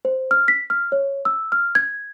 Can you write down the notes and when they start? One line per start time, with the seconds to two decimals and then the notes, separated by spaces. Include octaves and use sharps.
0.05 C5
0.31 F6
0.48 B6
0.70 F6
0.92 C#5
1.25 E6
1.52 F6
1.75 G#6